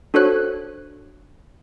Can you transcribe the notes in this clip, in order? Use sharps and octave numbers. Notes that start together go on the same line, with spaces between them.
D4 F#4 A4 C5 C#5 F#6